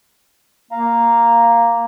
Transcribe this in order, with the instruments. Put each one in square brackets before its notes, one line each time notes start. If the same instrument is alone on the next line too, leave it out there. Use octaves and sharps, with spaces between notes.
[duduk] A#3 [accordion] F5 A#5